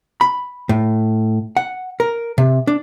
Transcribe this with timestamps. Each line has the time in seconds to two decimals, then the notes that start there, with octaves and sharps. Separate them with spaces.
0.21 B5
0.69 A2
1.57 F#5
2.00 A#4
2.38 C3
2.67 D4